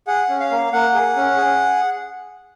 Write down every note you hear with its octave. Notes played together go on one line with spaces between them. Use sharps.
G#4 F#5
C#4
F5
A#3
A#3 F#5
G#4
C#4
G#4